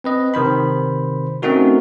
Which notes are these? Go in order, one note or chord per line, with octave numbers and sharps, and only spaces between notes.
C4 B4 D#5
C3 D#3 C5 B5
A3 C4 C#4 D#4 F#4 A#4